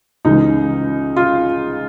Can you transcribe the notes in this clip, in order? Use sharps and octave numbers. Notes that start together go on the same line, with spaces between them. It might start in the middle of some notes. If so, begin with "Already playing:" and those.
C#2 C#3 E3 G#3 D#4
F4